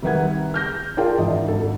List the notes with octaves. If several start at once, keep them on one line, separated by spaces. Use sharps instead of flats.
C2 D#3 B4 F#5 G#6
F6 G6 A#6
D4 F4 G#4 A#4 F5 G5
G#1 E3 D4 D#5
G#1 A4